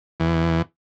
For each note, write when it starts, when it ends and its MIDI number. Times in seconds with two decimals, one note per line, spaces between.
0.20 0.62 40